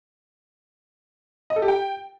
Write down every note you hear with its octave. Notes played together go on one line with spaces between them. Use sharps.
D#5
A4
G4
G5